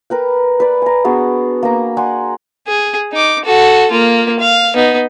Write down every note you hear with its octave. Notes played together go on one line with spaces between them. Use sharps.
A#4 B4 G5
B4 D5
G#5 A#5
B3 D4 F#4 G#4
A#3 A#5
D5 F#5 G#5 C6
G#4
D#4 D6
F#4 A4
A#3 F4
F5
B3 D#4